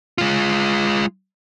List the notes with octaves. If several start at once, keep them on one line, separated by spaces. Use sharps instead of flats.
G#3 F4